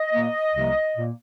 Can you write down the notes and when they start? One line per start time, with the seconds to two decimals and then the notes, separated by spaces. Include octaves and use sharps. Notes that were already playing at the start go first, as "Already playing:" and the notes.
Already playing: D#5
0.13 A#2 A#3
0.54 C2 C3 F3 A#3
0.96 A#2 A#3